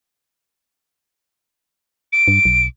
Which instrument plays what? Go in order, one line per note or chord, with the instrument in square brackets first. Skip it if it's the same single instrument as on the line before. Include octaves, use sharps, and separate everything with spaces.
[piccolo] D7
[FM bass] G2
B1